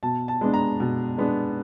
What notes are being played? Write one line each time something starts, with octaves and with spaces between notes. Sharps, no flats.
B2 A5
A5
G#3 B3 D4
A#5
B2
G#3 B3 D4